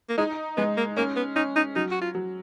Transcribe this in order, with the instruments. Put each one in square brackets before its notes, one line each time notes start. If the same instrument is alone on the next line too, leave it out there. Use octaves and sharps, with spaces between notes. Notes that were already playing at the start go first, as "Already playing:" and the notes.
[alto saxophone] A#3
[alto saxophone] G#3 [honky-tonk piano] D#4
[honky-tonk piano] G#3 [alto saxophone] B3
[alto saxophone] A#3
[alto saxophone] A#3 [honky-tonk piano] C#4
[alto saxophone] B3
[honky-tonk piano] C#4 [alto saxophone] D#4
[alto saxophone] D#4
[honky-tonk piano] F#3 [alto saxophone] D#4
[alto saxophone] F#4
F4
[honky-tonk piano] F#3